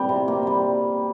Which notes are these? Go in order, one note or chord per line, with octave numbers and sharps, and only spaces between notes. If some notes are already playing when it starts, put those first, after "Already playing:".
Already playing: G3 G5
C3
A#3
G3